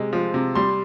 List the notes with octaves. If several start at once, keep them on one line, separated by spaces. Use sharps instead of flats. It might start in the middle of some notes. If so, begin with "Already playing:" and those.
Already playing: C3 G#3
F3
C3
G3 C6